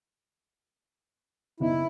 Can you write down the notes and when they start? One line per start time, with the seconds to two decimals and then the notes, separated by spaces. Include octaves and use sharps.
1.60 F#1 B3 D#4 E4